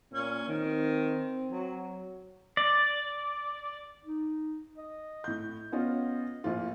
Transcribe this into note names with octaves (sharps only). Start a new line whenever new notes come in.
A#2 C#4
D#3 C4
F#3
D5
D#4
D#5
A2 G6
B3 C#4 F4 D#5
A#1 A2 F4 C5